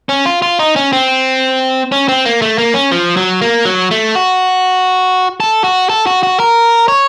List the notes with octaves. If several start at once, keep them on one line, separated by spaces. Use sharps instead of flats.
C#4
F4
F4
D#4
C#4
C4
C#4
C4
A#3
A3
A#3
C#4
F3
F#3
A#3
F#3
A3
F#4
A4
F#4
A4
F#4
F#4
A#4
C#5